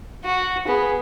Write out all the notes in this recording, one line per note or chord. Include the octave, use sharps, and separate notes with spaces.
F#4
B3 G#4